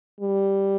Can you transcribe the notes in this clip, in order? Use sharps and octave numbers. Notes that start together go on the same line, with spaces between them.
G3